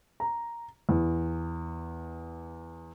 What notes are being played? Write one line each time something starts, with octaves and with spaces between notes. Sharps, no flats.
A#5
E2